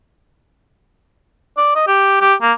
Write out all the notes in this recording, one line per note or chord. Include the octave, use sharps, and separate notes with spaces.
D5
D#5
G4
G4
A#3